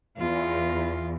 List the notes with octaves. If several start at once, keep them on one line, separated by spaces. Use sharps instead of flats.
E2 F4